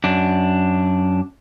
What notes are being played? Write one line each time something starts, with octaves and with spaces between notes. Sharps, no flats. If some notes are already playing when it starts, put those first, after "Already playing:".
F#2 D4